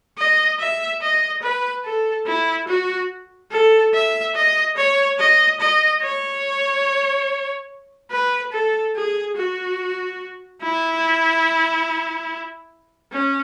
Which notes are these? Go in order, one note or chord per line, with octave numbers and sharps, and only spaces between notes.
D#5
E5
D#5
B4
A4
E4
F#4
A4
E5
D#5
C#5
D#5
D#5
C#5
B4
A4
G#4
F#4
E4
C#4